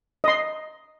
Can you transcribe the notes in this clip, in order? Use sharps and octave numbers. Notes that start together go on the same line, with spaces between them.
D#5 C6